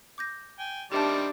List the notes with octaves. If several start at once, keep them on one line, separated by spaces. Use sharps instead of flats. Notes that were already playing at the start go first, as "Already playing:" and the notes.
D6 G6 A#6
G5 G#5
D#3 G3 C4 D4 G4 D5 E5 A5